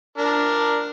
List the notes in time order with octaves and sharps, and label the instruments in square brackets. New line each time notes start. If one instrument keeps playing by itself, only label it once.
[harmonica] D4 A#4